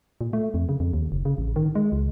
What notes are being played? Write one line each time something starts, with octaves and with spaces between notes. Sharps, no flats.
A#2
A3
F2
C#3
F2
D#2
F#1
C#3
A1
D#3
G#3
C#2